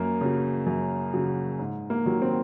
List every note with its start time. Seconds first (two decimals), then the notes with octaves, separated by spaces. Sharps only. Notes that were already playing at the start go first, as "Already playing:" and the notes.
Already playing: F#2 A#3
0.21 C#3 F#3
0.66 F#2
1.14 C#3 F#3
1.59 G#2
1.90 A#3
2.06 D#3 F#3
2.22 C4